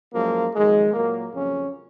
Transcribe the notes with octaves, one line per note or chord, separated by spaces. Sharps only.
F#2 F3 G#3 A#3
F2 D#3 F#3 G#3
A#2 F#3 A#3
F2 C#3 F#3 C#4